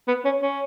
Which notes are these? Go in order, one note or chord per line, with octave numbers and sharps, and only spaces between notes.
B3
C#4
C#4